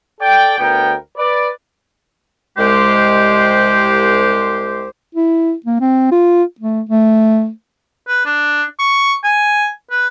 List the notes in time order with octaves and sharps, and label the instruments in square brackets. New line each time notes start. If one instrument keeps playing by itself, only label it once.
[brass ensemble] A4 D5 G5
D2 B3 A#4 G5
B4 D5
[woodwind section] C2 G#3 G4 C5
[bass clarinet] E4
A#3
C4
F4
A3
A3
[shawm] B4
D4
C#6
G#5
B4